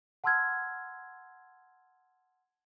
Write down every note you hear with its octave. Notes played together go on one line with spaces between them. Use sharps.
F#5 A5 C6 E6 F6 G#6